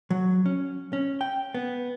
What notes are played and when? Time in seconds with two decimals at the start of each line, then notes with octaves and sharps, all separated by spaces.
0.10 F#3
0.46 C#4
0.93 C#4
1.21 G5
1.55 B3